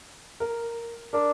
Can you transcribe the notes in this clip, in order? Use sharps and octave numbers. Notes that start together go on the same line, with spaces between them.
A#4
D4 A#4